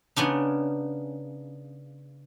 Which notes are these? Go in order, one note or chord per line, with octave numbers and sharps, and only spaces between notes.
C#3 B3 D4 D#4